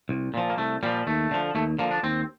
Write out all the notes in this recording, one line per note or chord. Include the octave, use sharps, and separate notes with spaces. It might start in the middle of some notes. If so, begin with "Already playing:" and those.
C2
A#2 F3
A#3
C2 A3
A#2 F3 G3
D#2 A3
D3 F3
D#2 A3
D3 F3 A#3
D4
D#2 C4